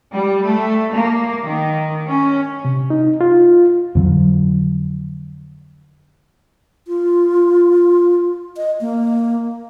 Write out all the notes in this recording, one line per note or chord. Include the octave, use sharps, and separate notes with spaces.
G3
A3
A#3
D#3
C#4
C3
D#4
F4
F2 D3 F#3
F4
D#5
A#3